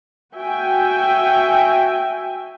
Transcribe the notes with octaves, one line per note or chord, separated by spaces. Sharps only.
F#4 E5 G5 G#5